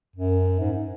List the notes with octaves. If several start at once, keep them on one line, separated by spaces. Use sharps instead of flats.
F#2
G#2